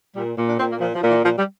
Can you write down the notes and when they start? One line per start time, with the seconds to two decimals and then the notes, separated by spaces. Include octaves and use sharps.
0.16 A#2 G3
0.37 A#2
0.49 D4
0.59 A#2 C4
0.70 A#3
0.80 A#2 F3
0.95 F3
1.03 A#2
1.10 E3
1.24 A#2 F3
1.39 G3